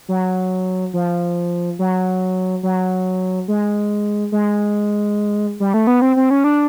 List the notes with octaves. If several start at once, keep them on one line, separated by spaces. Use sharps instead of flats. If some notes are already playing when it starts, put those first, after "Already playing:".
F#3
F3
F#3
F#3
G#3
G#3
G3
A3
B3
C4
C4
C#4
D4